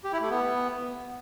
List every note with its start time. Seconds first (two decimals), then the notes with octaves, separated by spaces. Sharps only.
0.04 G4
0.13 E4
0.21 A3
0.30 B3